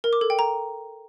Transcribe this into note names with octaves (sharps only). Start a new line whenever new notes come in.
A#4
D6
A4
G5
A#5